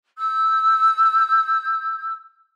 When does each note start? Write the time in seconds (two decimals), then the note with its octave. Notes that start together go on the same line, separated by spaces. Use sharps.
0.17 E6 G6